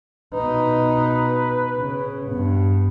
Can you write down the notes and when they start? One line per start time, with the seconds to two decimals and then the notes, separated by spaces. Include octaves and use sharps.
0.34 B2 D#4 B4
1.78 C#3
2.28 G2 B3